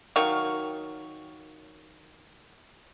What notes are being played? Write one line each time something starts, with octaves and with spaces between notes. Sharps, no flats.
D#3 F#3 F5 C#6